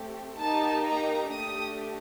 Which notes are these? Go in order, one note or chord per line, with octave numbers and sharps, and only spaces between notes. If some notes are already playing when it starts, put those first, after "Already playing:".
Already playing: A3 C4 G4
A#3 D#4 G4 A5
A#5
A3 D4 G4 D#6